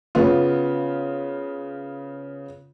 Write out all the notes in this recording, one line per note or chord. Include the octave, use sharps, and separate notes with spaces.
C#3 B3 F4